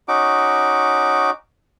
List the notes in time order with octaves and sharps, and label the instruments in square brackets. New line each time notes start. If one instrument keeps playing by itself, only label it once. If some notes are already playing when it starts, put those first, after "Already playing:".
[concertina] C#4 D#4 F#4 D6